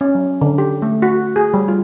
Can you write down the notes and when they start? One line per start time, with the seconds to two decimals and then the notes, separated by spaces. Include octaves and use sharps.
0.01 C#4
0.15 F#3
0.41 D3
0.58 G4
0.82 A3
1.02 F#4
1.36 G#4
1.54 G3
1.68 F4